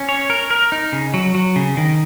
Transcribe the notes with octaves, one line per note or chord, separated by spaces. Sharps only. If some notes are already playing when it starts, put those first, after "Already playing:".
Already playing: C#4
C#5
A#4
A#4
D#4
C#3
F#3
F#3
C#3
D#3